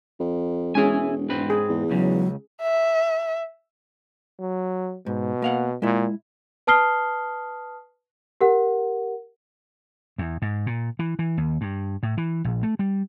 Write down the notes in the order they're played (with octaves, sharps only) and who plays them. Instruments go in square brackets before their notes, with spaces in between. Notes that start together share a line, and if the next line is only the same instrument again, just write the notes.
[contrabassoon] F2
[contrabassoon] E1 [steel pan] G#3 C#4 G#4 [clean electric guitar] E4 G#5
[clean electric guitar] G#2 C4 B4
[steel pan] G#4
[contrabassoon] E2
[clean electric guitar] C#2 C#3 [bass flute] F#3
[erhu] E5
[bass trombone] F#3
[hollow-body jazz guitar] G#2 [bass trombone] B2
[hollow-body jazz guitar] A#3 F5 F#5
[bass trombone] A#2 [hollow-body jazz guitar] G#3 E4
[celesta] B4 A5 D#6 F6 C7 G7
G4 A#4 F#5
[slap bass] E2
G#2
A#2
E3
E3
D#2
G2
A2
E3
A#1
A3
G3